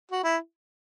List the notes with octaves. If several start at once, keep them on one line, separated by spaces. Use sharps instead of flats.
F#4
E4